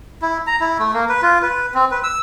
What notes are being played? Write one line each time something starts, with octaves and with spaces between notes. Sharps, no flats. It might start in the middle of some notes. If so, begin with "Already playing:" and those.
E4
A#5
E4
A3
A#3
B4
F4
B4
C4
B4
E6